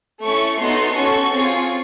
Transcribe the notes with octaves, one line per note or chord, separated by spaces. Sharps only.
A3 C#4 E4 C#6
B3 D#4 F#4 A4 C6
C#4 F#4 A4 C#6
C4 F4 G#4